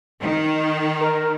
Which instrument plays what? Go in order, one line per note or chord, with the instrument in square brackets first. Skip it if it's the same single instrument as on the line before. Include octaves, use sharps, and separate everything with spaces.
[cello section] D#3
[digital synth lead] A#4